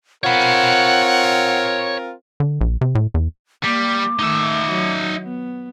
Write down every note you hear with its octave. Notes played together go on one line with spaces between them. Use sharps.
C4 F4 A#4 C#5 F#5 B5
D3
A#1
C3
A2
E2
G3 A#3 D6
D#3 A3 D#4 E5
F#3
B3